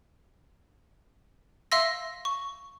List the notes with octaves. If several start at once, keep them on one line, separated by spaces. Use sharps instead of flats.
E5 F5 C6 E6 A#6
C#6